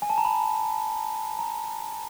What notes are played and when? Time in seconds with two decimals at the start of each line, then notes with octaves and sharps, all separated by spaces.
0.02 G#5
0.10 A5
0.18 A#5
0.25 B5
1.39 A#5